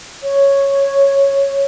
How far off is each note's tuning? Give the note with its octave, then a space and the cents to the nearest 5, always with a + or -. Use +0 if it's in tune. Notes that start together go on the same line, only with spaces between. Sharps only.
C#5 -5